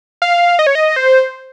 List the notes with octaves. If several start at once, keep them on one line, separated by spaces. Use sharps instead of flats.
F5
D#5
C#5
D#5
C5